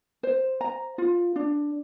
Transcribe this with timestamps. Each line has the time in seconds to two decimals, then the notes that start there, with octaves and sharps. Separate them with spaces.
0.23 C5
0.61 A#5
0.98 F4
1.36 D4